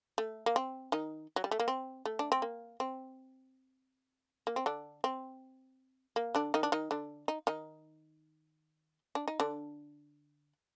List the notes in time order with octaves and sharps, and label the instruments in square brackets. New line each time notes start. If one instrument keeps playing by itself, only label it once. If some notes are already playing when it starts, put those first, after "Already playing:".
[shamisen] A3
A#3
C4
D#3 D#4
F#3
G3
A3
A#3
C4
A3
D4
C4
A#3
C4
A#3
C4
D3 D4
C4
A#3
D3 D4
D#3 D#4
D4
D#3 D#4
D3 D4
D#4
D#3 D#4
D4
D#4
D3 D4